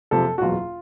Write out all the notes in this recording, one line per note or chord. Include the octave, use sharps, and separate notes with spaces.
F#1 F2 C3 F3 A4
F#4
F#1 E2 B2 F#3 F4